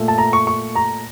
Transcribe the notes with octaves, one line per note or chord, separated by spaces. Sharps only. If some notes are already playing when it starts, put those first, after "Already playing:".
Already playing: A#2 A3
A5
A#5
C#6
C#6
A#5